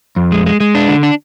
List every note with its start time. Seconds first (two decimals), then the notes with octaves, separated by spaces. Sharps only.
0.16 F2
0.32 G#3
0.46 G#3
0.60 G#3
0.75 D4
0.88 D3
1.03 D4